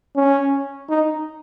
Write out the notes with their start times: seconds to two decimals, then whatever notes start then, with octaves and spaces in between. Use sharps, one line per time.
0.16 C#4
0.89 D#4